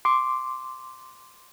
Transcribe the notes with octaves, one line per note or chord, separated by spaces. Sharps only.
C6 D6